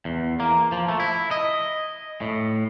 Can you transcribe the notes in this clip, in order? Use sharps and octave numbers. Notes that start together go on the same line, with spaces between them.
E2
A#3
F3
A3
E4
D#5
A2